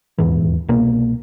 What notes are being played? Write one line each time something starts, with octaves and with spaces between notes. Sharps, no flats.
D#1 E2 G#2 E3
C2 B2 A#3